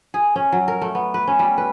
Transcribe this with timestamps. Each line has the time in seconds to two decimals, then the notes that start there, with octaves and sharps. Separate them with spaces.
0.14 G#4
0.36 C#4
0.52 F#3
0.68 A#4
0.82 A3
0.95 B3
1.14 B4
1.27 C#4
1.39 G3
1.58 B4